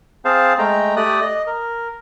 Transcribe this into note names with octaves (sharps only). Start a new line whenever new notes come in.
C4 G#4 C5 F5 A5
G#3 A3 G5 A#5
A3 G4 D5 D#6 F#6
D#5
A#4